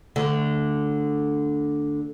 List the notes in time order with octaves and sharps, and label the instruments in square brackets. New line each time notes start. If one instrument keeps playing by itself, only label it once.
[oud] D2 D3